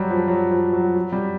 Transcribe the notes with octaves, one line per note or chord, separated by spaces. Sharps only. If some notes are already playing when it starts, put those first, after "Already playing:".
Already playing: F#3 G3
F3
F#3
F3
F#3
F#3
G3